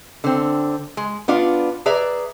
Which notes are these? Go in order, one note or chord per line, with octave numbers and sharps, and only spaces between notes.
D3 C4
G#3
B3 D4 F4 D5
G#4 B4 D5 E5 A#5